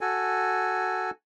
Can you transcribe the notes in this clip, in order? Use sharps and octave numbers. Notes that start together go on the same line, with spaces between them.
F#4 A4 G#5